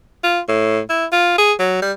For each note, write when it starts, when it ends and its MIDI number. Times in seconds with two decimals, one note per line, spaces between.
0.24 0.40 65
0.48 0.80 45
0.89 1.06 64
1.12 1.38 65
1.38 1.53 68
1.59 1.78 54
1.82 1.92 55